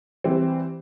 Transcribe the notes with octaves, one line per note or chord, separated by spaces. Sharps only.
E3 G3 C4